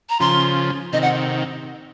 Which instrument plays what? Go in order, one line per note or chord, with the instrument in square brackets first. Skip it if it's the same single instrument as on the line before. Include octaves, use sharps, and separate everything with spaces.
[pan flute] A#5
[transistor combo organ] C#3 F3 [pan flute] C6
[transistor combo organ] C3 D#3 [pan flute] D#5
[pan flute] F#5